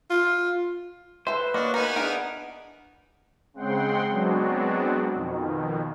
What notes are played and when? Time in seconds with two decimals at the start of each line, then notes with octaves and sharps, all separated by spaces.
0.10 F4
1.27 A4 B4 C5 E5
1.54 A#3 D4 F#4 C#5 D#5
1.74 B3 D#4 A#4 G#5
1.96 D4 E4 G#4 A#4 F#5
3.54 C#3 G#3 C4 F#5 G5 C6
4.11 F#3 G#3 B3 C4 D4 F#4
5.13 F2 B2 D#3